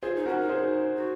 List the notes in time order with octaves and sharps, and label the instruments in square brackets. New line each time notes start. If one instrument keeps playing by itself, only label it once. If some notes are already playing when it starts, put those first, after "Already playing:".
[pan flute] F4 [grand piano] G#4 C5
[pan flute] D#4
[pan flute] C#4 [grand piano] F#4 A#4
[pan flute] D#4
[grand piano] G#4 C5
[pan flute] F#4